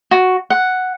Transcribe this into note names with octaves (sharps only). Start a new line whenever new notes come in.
F#4
F#5